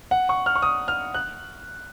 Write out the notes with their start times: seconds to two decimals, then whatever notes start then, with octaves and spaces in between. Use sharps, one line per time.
0.11 F#5
0.29 C#6
0.46 F6
0.56 C#6
0.62 D#6
0.88 F6
1.14 F#6